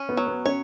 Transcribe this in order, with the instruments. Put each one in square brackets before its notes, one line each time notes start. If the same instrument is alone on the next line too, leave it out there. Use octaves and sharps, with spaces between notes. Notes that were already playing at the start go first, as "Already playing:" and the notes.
Already playing: [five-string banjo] C#4
[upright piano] B3
[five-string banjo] F#3
[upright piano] B3
[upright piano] C#4 [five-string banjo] C#5